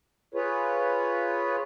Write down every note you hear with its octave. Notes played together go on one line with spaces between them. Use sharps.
F4 G#4 B4 C#5